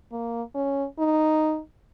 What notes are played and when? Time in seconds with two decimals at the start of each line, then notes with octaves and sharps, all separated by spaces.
0.12 A#3
0.55 C#4
0.99 D#4